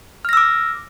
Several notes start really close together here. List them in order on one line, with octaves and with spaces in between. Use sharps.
F6 A#6 E6 D6